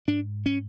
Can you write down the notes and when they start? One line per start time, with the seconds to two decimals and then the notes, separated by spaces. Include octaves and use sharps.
0.08 G#2 D4
0.46 C#4